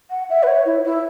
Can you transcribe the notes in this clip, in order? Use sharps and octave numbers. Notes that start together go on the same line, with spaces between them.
F#5
E5
B4
C#5
E4
E4